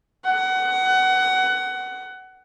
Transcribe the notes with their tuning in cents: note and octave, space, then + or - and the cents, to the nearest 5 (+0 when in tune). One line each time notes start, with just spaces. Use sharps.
F#5 +20